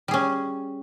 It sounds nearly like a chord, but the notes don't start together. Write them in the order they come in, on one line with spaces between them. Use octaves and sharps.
G3 G#4 C#4